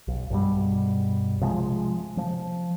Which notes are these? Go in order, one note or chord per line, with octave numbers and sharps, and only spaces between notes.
B1
B1 G2 B2 G3
C3 F3 G#3
F3